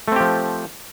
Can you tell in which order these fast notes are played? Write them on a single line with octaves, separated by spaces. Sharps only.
A3 C4 G4 F3